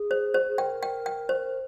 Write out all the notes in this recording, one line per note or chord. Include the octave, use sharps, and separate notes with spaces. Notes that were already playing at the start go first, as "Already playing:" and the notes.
Already playing: G#4
C5
C5
G#4
A#4 G5
G5
G5
C5